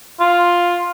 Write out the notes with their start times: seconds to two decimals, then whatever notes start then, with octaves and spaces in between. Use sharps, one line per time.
0.20 F4